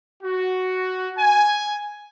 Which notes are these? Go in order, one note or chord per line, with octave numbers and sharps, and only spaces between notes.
F#4
G#5